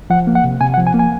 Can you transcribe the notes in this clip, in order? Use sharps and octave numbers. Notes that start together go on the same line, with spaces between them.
F3 F#5
A#3
F#5
C3
C3 G#5
F#5
F3
G#5
A#3
G#5